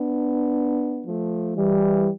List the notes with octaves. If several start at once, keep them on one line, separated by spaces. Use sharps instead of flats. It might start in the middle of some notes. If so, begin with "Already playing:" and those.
Already playing: B3 D4
F3 A3
E3 G3